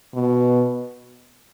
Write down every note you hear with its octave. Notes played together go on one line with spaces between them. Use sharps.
B2